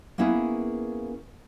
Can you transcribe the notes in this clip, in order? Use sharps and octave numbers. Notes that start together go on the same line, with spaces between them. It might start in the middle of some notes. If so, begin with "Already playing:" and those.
A#3 B3 C#4 E4 G#4 B4